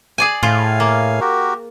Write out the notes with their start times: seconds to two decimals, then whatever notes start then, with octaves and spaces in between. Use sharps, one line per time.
0.18 G#4 D5 G#5
0.43 A2 F4 F5 G#5
0.80 A#3
1.21 F#4 G4 A#4